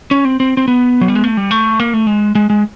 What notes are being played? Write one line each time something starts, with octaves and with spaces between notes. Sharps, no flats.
C#4
C4
C4
C4
B3
F#3
G3
G#3
A3
G3
A3
A#3
A3
G#3
G#3
G#3